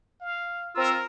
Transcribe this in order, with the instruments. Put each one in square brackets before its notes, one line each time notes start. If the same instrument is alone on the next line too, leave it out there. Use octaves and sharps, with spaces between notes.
[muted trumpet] F5
[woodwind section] C4 F4 E6 [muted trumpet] A#4